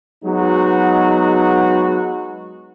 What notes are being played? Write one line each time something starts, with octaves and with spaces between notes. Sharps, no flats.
F#3 G#3 B3 D#4 F#4